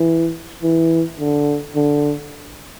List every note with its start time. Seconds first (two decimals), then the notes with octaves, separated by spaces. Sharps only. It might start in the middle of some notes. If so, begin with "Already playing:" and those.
Already playing: E3
0.63 E3
1.19 D3
1.76 D3